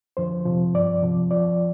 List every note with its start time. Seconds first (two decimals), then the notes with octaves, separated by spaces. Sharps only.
0.17 F2 D3 F3 C5
0.46 F2 C3 F3
0.74 G2 F3 D5
1.02 F2 C3 F3
1.31 F2 F3 D5